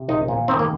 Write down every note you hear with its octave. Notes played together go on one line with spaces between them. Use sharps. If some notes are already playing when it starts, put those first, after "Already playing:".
Already playing: C3
A#1 D#4
A#2
D#3 C4
A#3